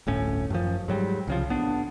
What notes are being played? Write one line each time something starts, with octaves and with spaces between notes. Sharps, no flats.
D1 G1 A2 C#4
F#2 D#3 F3
G#2 F#3 G3
C2 C#3 F3
A1 B3 D4